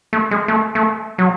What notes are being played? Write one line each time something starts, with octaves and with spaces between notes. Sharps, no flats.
A3
G#3
A3
A3
F#3